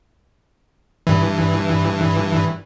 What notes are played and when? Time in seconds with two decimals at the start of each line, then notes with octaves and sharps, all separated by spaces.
1.07 G2 E3